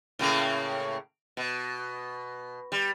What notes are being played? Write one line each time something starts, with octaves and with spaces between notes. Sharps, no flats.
A2 C#3 A#3
B2
G3